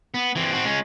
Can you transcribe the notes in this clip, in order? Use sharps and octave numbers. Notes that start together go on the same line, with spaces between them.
B3
E3 C4
C4 F#4
G#3 C#4